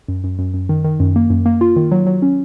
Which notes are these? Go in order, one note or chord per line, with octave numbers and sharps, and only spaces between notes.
F#2
F#2
F#2
F#2
D#3
D#3
F#2
A#3
F#2
A#3
F4
D#3
F#3
F#3
C#4